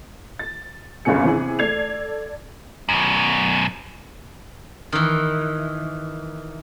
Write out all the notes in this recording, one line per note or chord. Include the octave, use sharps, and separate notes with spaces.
A6
G1 C2 F#2 C3 G#4 C#7
C3 E3 G#4
A3 A4 D5 G#6 C7 F7
F#2 B2
D#3 E3